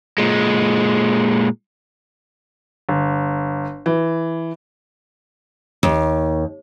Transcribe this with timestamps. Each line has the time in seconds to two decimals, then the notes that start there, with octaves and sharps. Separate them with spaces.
0.18 A#2 G#3
2.89 G1
3.86 E3
5.83 D#2